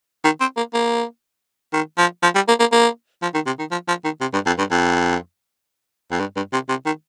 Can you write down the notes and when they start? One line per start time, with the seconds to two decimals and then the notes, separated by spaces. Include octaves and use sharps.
0.24 D#3
0.41 C4
0.57 A#3
0.74 A#3
1.73 D#3
1.98 F3
2.23 F3
2.35 G3
2.48 A#3
2.60 A#3
2.72 A#3
3.22 F3
3.34 D#3
3.46 C3
3.59 D#3
3.71 F3
3.88 F3
4.04 D#3
4.21 C3
4.33 G2
4.46 F2
4.58 G2
4.71 F2
6.11 F2
6.20 G2
6.36 G2
6.53 C3
6.69 C3
6.86 D#3